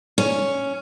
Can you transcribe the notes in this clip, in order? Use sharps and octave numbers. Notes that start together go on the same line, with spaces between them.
C#4